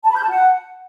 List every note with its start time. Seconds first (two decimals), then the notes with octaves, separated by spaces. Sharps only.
0.04 A5
0.10 B5
0.16 G6
0.23 A5
0.29 F#5